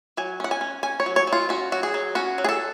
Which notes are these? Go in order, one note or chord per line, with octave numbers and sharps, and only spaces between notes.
F#3 G#5
C#4 F#5
G#5
C#4
C#4 G#5
C#5
F#3
C#5
F#3
F4
C#4 F#4
F#3 F#4
G#4
F#3
C#4 F#4
F#3
G#4
A4